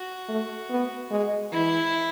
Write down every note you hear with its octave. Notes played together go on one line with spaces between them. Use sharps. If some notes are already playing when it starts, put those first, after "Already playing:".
Already playing: F#4
A3
B3
G#3
E3 E4